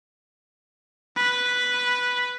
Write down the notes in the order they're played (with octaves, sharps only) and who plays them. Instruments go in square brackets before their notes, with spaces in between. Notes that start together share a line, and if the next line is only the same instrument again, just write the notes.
[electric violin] B4